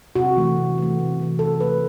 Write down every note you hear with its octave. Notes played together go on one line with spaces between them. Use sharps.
C3 F#4
E3 A3
C3
E3 A3
C3
E3 A3
C3 A4
E3 A3 B4